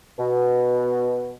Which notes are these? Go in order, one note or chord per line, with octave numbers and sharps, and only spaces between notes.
B2